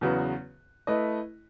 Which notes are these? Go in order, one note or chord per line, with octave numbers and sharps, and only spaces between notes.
E2 C#3 F#3 B3 F#4
A3 E4 B4 D#5